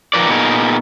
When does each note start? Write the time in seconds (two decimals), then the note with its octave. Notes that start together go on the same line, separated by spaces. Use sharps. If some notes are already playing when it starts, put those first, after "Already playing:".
0.13 D#3 F3 A#4 B4 D5
0.29 A#2 B3 D#4 G#4 A#4